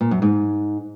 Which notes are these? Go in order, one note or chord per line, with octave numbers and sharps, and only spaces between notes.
A#2
F#2
G#2